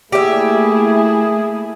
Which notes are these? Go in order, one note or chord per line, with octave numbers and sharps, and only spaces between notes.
A3 A#3 E4 G4 G#4 E5